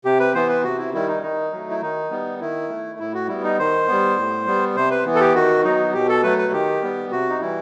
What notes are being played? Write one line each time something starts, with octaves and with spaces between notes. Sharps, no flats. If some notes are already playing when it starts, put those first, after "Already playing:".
C3 G4
B4
E3 B3 C5
B4
C3 F#4
E4
D#3 G3 E4
D#4
D#3 D#4
F#3 A3
E4
D#3 D#4
G3 B3
D#3 E4
A3
A2 E4
F#4
G3 B3 E4
D#4
D#3 C5
G3 B3
A2
G3 B3
C3 C5
B4
E3 B3
A4
G4
D#3 F#4
F#3 B3 D#4
B2 G4
A4
F#3 A3 B4
B4
D#3 G4
G3 B3
C3 F#4
D#4
E3 G3 E4